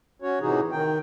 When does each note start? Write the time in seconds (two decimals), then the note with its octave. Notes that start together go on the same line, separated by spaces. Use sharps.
0.22 C#4 F#4 C#5
0.41 A2 C3 E3 D#4 F#4 G#4
0.72 D#3 G5